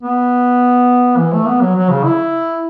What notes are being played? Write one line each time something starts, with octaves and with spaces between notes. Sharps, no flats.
B3
E3
A3
B3
F#3
F#3
C#3
E4